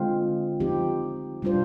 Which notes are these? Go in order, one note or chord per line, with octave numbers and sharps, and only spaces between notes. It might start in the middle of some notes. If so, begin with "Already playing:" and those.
Already playing: D3 G#3 C4 F4
F3 C4 D#4 G4
C3 G3 D4 F4 C5